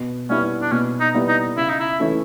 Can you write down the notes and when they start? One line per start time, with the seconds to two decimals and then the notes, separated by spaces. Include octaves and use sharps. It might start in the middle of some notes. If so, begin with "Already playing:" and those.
Already playing: B2
0.30 G3 B3 C#4 E4
0.61 D4
0.72 B2 C#4
1.00 D#4
1.14 G3 B3 E4
1.28 D#4
1.57 C#3 E4
1.69 D#4
1.80 E4
2.00 E3 A3 C#4 E4